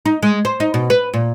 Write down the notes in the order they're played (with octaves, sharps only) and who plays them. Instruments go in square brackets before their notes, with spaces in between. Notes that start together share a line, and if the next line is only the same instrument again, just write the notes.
[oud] D#4
G#3
C5
D#4
B2
B4
A#2